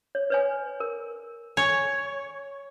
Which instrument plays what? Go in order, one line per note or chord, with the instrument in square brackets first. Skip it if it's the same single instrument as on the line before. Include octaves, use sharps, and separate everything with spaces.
[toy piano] C#5
B4 C#5 G#5
A#4
[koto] C#5 [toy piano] G#5